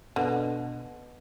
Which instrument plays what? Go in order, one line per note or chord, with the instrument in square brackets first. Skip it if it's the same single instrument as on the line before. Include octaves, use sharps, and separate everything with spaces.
[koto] B2 [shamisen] D3